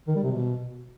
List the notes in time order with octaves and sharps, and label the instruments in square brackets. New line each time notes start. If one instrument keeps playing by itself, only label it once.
[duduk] D#3
G3
C3
B2